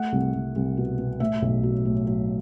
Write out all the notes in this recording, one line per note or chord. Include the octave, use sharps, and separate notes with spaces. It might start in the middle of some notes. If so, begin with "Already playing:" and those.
Already playing: A3 F#5
C2
C2
C2
B2
B2
A2 E5
B1
F#3
A2
F#3